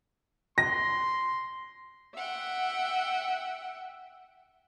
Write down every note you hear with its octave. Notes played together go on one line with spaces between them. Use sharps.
C6 A#6
E5 F#5 G5